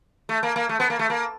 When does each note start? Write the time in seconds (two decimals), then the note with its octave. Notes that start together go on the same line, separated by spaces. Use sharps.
0.29 A3
0.43 A#3
0.56 A#3
0.69 A3
0.80 B3
0.90 A#3
0.99 A3
1.10 A#3